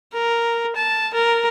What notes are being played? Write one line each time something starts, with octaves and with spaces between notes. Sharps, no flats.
A#4
A5
A#4